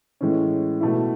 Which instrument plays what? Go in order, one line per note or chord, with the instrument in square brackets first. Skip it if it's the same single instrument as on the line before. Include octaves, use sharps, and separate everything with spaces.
[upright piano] A2 E3 G#3 C#4
B2 A3 E4